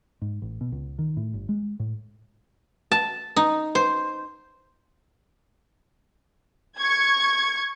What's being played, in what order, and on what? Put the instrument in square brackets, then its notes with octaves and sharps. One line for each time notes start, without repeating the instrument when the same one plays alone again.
[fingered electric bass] G#2
A1
B2
C#2
D#3
A2
G1
G#3
A2
[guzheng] A5
D#4
C5
[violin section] C#6 G#6